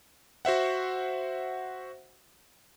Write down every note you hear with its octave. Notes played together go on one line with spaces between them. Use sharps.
F#4 C5 E5 F#5